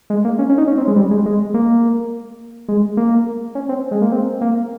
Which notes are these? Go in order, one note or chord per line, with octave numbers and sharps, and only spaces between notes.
G#3
A#3
C#4
C#4
D#4
C#4
C4
G#3
G3
G#3
G#3
A#3
G#3
A#3
C#4
C4
G#3
A#3
C4
A#3